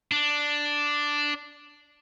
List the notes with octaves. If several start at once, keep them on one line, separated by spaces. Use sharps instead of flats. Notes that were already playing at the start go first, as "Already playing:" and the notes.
D4